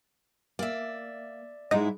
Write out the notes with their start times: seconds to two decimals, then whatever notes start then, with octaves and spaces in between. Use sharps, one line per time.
0.59 A#3 D5 E5
1.71 G#2 G#3 D#4 E4 D5